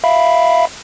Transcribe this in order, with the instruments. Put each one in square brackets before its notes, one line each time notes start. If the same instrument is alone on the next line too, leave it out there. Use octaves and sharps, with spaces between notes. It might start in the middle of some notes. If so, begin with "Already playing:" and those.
[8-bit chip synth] E5 F5 B5